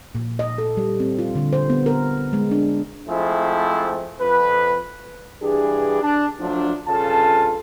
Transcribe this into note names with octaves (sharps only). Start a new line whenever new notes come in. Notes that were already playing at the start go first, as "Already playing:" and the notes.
A#2
D#5
A4
G3
C4
F4
D3
C5
B3
A#4
G#3
D4
F3 G#3 A3 C4 E4
F2 B4
G2 E3 D4 G4 G#4
D4 A5
F3 F#3 A3 D4
G2 C#3 F4 A4 A5